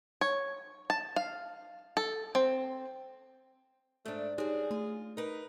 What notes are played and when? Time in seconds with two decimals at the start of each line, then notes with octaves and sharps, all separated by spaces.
0.21 C#5
0.90 A5
1.16 F5
1.97 A4
2.35 C4
4.05 G#2 A3 D4
4.38 G3 D4 D#4 G4 G#4 C#5
4.71 A3 F4
5.17 D#4 A#4 B4